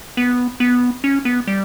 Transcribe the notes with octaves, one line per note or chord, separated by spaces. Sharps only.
B3
B3
C#4
B3
G3